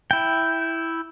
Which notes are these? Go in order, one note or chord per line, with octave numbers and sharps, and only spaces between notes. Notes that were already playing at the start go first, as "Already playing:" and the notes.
E4 G5